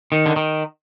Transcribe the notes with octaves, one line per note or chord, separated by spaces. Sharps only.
D#3
D3
D#3